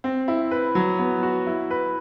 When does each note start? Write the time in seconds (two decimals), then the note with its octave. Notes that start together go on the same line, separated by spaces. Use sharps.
0.04 C4
0.28 E4
0.51 B4
0.75 F#3
0.99 B3
1.23 F#4
1.47 E4
1.71 B4